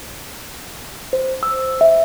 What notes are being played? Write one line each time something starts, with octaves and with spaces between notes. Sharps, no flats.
C5
E6
E5